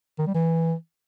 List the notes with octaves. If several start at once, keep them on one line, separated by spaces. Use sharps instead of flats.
D#3
G3
E3